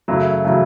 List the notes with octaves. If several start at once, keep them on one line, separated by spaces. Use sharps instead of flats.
F#2 C#3 F#3 A3 E4
C#3 F#3 A3 E4